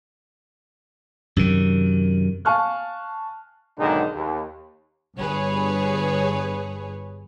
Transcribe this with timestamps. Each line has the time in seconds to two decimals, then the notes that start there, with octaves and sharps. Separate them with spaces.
1.36 F#2 C3 D#3
2.45 F5 G#5 A5 C#6 F6 F#6
3.79 B1 G#2 D3 D#3 D#4 G#4
4.15 D#2
5.17 G1 G2 G#4 B4 C#5